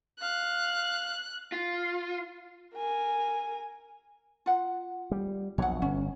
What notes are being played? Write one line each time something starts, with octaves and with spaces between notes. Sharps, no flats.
F5 F#6
F4
A#4 G#5
F4 F#5
G3
A#1 B2 F#3 C#5 F#5
G1 C#4